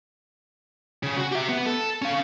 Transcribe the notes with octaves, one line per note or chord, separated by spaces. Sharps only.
C#3
F#4
G4 E5
B3
A4
C#4 F5